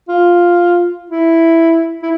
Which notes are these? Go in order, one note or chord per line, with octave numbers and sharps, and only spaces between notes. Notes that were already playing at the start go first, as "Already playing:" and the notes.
F4
E4
E4